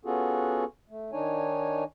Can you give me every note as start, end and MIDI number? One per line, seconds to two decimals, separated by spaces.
0.05 0.64 59
0.05 0.64 61
0.05 0.64 65
0.05 0.64 66
0.05 0.64 68
0.05 0.64 69
0.90 1.11 57
1.12 1.84 51
1.12 1.84 62
1.12 1.84 63
1.12 1.84 73
1.12 1.84 80